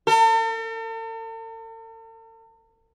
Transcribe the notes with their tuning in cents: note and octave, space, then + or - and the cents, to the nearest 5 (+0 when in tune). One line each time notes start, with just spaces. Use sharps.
A4 +45